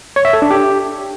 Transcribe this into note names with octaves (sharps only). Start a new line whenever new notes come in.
C#5
E5
A4
D4
G4